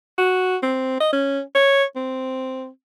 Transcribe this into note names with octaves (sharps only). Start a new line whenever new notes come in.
F#4
C4
D#5
C#4
C#5
C4